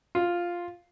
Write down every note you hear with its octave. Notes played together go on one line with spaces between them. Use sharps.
F4